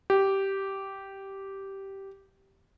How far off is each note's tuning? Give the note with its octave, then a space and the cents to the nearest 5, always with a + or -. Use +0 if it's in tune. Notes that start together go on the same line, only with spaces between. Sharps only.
G4 -10